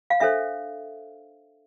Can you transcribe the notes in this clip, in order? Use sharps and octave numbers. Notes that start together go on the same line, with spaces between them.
F5
D4 A4 C5 E5